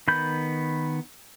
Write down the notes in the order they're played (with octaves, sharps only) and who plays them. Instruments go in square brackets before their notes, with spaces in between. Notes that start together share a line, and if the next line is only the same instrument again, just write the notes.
[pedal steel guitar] D#3 B3 B5 G6